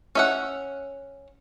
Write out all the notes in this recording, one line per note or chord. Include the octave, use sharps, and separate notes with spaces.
C#4 E5 F#5